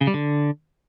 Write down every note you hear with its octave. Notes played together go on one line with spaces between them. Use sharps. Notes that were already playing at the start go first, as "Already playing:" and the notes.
C#3
G3
D3